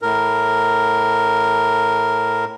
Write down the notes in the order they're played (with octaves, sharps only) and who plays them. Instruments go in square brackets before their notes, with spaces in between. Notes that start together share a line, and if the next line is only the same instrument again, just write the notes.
[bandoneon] A2 A#4